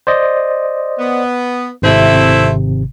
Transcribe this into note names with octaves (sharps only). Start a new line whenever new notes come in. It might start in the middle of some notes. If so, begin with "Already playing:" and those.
C5 D5 D#5
B3
G#1 C3 A3 C4 E4